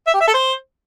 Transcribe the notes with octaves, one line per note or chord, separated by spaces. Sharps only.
E5
G4
E5
A4
C5